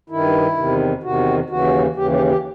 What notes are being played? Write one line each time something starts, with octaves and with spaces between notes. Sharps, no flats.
G2 D#3 E4
E2 C3 D#3
E2 C3 D#3 F#4
D#2 C#3 E3 F#4
D#2 C#3 E3 G4
G4
G4